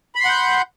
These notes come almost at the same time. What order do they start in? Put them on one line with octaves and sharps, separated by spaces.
B5 C6 F#5 G6